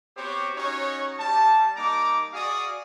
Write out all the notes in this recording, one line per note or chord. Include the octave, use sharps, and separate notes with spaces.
B3 C4 F#4 G4 C5 C#5
C#4 D#4 F#4 C#5
G3 A5
G3 A#3 D#4 A#5 D6
F#4 G#4 D5 F5 D#6